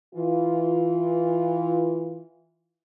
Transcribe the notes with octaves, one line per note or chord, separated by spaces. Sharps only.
E3 F4